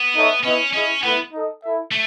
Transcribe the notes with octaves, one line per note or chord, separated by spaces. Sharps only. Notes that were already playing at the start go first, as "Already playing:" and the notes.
Already playing: B3
D#4 A4 C#5 E5
B3 C#4 E4 B4 D#5
C#4 E4 G#4 D#5
A3 B3 E4 B4 F#5
D#4 A4 D#5
E4 A4 E5
A3